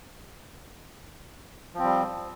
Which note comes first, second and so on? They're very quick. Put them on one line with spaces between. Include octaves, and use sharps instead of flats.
F3 C4 G3